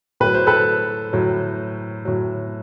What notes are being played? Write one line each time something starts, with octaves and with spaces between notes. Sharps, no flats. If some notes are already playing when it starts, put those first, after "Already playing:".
A2 F#3 B4
C5
A4 B4
A2 F#3
A2 F#3